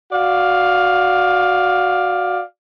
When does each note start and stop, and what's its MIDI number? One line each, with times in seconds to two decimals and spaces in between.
0.11 2.41 66
0.11 2.41 74
0.11 2.41 77